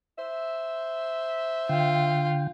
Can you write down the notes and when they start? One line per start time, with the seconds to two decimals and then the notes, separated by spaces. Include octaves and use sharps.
0.17 C5 E5
1.69 D3 F4 G5